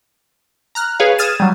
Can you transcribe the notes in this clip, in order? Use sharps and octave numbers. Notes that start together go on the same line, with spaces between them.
A#5 F6 F#6
G#4 B4 C#5 F5
D#6 F6 G#6 A6 D#7 E7
F#3 G3